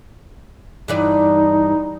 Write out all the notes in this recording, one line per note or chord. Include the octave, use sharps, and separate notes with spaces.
G2 E3 D#4 D5